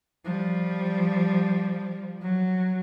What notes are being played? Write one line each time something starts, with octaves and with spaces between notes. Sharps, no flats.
F3 G3
F#3